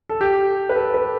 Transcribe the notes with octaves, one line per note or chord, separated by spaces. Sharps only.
A4
G4
B4
A4
B4